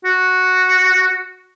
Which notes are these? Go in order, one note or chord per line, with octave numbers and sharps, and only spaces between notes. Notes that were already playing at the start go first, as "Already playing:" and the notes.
F#4